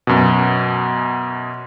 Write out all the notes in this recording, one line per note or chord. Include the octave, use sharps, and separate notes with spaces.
F#2 B2